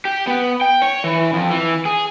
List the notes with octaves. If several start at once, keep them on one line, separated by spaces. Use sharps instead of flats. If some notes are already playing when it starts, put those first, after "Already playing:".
G4
B3
G5
C#5
E3
F2
E3
G#4